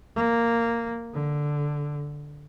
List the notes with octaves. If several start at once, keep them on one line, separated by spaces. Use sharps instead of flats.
A#3
D3